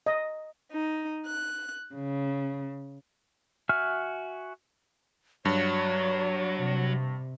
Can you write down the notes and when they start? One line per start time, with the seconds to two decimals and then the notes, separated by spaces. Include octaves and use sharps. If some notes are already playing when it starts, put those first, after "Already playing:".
0.06 D#5
0.72 D#4
1.27 F#6
1.95 C#3
3.69 F#4 E5 G#5 F6
5.45 G2 F#3 C#5
6.57 C3